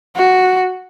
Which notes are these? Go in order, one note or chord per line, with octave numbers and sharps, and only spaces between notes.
F#4